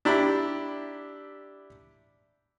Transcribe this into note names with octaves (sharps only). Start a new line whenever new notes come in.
D4 E4 G4 A#5 B5